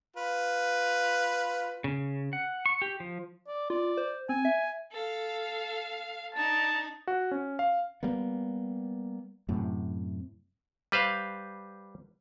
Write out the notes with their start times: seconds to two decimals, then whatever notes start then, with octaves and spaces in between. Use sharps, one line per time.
0.17 F4 B4
1.84 C#3
2.33 F#5
2.66 C#6
2.82 G4
3.00 F3
3.48 D5
3.70 F4 D5
3.97 C5
4.29 C4 G#5
4.45 E5
4.91 A4 F5
6.35 D4 D#4 A5
7.07 F#4
7.31 C#4
7.59 F5
8.03 G3 A#3 B3
9.49 F#2 A2 C3
10.92 G3 B4 C5 F5